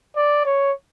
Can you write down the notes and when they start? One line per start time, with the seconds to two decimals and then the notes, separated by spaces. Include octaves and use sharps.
0.16 D5
0.46 C#5